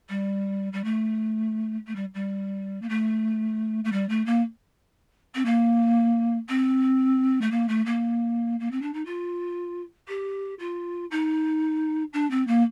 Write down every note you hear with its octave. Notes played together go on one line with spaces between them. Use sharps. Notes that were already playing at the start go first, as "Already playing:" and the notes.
G3
G3
A3
A3
G3
G3
A#3
A3
A3
G3
A3
A#3
C4
A#3
C4
A3
A#3
A3
A#3
A#3
C4
D4
D#4
F4
G4
F4
D#4
D4
C4
A#3